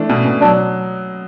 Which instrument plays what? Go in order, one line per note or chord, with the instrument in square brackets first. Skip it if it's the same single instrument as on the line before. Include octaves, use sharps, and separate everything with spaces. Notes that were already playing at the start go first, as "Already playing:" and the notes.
Already playing: [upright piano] E3 A3 D4
B2
B2
[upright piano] F#3 [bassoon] D4